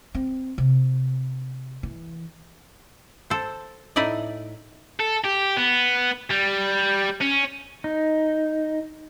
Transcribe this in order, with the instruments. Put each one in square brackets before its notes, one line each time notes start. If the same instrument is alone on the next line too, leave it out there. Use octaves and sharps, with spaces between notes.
[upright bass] C4
C3
E3
[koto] A4 C5
A2 D#4 E4 D5 D#5
[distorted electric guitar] A4
G4
B3
G3
C#4
[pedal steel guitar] D#4